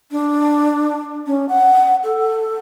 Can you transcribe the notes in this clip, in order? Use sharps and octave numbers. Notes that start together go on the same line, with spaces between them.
D4
C#4
F#5
A4